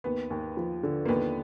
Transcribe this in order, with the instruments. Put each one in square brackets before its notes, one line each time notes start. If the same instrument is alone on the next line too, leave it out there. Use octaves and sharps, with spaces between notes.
[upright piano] D#2 [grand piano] B3
[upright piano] D#2
F3
D3
[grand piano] A#3
[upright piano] D#2 [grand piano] B3